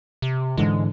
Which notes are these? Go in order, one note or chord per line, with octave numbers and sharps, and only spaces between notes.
C3
G#2 D3 E3 G#3